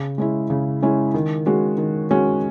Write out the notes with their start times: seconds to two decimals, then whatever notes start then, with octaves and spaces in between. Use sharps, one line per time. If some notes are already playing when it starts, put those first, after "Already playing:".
Already playing: C#3
0.18 G#3 C#4 E4
0.50 C#3
0.82 G#3 C#4 E4
1.14 D#3
1.46 G#3 C#4 F#4
1.78 D#3
2.11 G#3 C#4 F#4